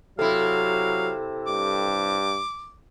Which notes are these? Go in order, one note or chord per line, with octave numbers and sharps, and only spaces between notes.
C3 F#3 E4 A4 F5
G2 D6